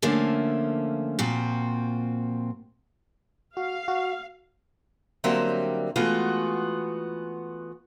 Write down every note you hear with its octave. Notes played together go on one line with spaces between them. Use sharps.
D3 F3 A3 A#3 C#4
A#2 F3 C4 F#4
F#4 F5
F#4
D3 F#3 G3 A#3 C4 E5
E3 G#3 A3 B3 F4 F#4